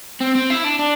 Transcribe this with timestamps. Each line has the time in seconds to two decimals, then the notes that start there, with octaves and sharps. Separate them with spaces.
0.21 C4
0.36 C4
0.50 E4
0.64 D4
0.79 D4